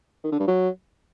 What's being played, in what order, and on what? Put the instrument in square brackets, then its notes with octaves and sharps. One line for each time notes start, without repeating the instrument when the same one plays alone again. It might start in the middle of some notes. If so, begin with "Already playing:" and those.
[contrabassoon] D#3
D3
G2
F#3